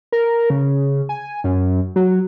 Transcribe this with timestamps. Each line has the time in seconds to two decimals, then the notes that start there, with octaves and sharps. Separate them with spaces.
0.12 A#4
0.50 C#3
1.09 G#5
1.44 F#2
1.96 F#3